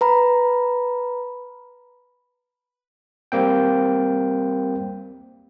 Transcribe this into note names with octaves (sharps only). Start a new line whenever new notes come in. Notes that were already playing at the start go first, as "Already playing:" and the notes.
B4 A#5 B5
G3 A#3 C4 G5